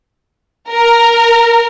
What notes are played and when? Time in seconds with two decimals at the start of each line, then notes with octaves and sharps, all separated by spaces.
0.69 A#4